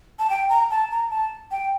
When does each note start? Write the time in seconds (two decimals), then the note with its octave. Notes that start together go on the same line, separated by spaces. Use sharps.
0.19 A5
0.30 G5
0.49 A#5
0.71 A5
0.91 A#5
1.11 A5
1.51 G5